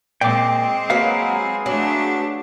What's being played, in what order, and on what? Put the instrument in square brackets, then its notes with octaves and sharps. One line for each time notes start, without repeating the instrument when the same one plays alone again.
[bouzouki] A#2 [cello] G#3 C4 [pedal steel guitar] G5 D6
[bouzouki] F#3 A#3 [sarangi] G#4 [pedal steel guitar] B4 F5
[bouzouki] F#3 [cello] A3 D4